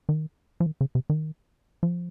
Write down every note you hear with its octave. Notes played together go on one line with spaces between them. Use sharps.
D#3
F3
D#3
C#3
C3
D#3
F3